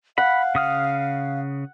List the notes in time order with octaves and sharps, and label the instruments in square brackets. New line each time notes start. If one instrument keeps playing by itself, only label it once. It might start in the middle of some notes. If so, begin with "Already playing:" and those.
[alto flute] F5 [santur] F#5 [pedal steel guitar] B5
[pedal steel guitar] C#3 D#6 F6